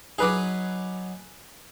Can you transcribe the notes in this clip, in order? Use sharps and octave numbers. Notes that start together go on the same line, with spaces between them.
F#3 D#4 G#4 B4 D6